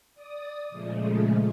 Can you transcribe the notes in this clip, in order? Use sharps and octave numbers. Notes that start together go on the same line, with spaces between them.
D5 D#6
A#2 C#3 F3 G#3 A3